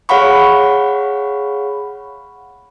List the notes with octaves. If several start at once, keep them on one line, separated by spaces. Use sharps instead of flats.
G#4 C#5 F5 F#5 B5 C#6